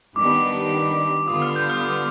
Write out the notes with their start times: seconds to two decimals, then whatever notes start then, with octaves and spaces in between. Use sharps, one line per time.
0.16 D#3 G3 B3 D4 G4 D6
1.28 D3 G3 B3 F4 D#6
1.42 F6
1.56 G6
1.70 F6
1.81 D#6
1.94 F6